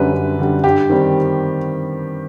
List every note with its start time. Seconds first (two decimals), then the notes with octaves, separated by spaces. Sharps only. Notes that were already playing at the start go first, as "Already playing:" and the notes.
Already playing: F#2 D3 G3 B4
0.12 F#2
0.39 D3 G3
0.64 G2 G4
0.90 D#3 G3 C4